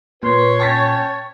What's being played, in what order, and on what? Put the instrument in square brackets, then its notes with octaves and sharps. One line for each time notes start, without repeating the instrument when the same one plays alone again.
[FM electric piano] A#2 [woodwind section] B4 C6 [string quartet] C#5
[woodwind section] C#4 G5 A5 [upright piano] C#6 A6 B6